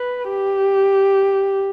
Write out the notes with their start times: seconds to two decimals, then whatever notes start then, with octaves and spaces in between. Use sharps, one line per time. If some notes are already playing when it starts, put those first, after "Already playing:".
Already playing: B4
0.29 G4